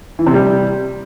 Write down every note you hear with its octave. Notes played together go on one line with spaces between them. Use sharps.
E3
C3
G3